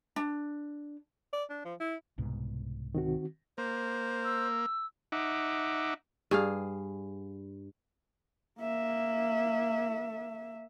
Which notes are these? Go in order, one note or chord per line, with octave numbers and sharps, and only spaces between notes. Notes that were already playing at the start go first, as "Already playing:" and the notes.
D4
D5
D4
F3
E4
C2 G#2 B2
D#3 C4 F#4
A#3 C5
E6
D#4 E5 F#5 D6
G2 G#4 F5
A#3 E5